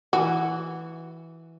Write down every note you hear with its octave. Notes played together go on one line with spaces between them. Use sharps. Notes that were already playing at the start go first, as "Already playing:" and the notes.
E3 F#4